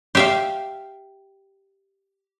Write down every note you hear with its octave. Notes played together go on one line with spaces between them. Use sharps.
G4 E5 F5